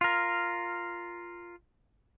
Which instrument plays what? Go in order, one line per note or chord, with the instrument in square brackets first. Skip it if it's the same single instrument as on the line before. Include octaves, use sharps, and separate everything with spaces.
[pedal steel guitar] F4 A#4